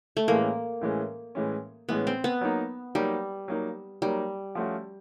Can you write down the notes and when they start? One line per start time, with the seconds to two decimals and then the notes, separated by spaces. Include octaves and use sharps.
0.17 A3
0.28 A2 E3 G#3 A#3 C#4
0.81 A2 E3 G#3 C#4
1.35 A2 E3 G#3 C#4
1.89 A2 E3 G#3 B3 C#4
2.07 C4
2.24 B3
2.41 F#3 A#3 D#4
2.95 F#3 G3 A#3 D#4
3.48 F#3 A#3 D#4
4.02 F#3 G3 A#3 D#4
4.55 F3 A3 C#4 F#4